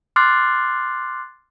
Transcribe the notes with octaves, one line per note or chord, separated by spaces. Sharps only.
C6 D6 F6 F#6 A6 C7